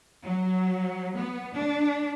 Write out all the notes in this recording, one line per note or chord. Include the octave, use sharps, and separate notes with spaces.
F#3
B3
D4